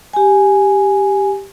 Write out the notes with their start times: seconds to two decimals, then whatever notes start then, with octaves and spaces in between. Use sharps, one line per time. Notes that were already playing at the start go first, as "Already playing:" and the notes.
0.13 G4 G#5